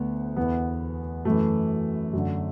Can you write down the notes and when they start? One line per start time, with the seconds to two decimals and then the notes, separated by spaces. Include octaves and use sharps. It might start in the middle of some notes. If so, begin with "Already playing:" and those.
Already playing: D2 D3 B3
0.36 E2 E3 B3
1.25 F#2 E3 A3
2.13 F#2 D3